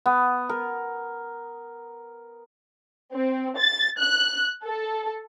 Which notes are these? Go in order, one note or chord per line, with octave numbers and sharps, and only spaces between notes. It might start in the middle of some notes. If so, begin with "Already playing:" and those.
B3
A#4
C4
A6
F#6
A4